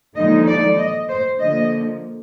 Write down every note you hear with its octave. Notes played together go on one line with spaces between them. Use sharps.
D#2 D3 F3 G#3 D#4 D#5
D5
D#5
C5
D3 F3 A#3 D#5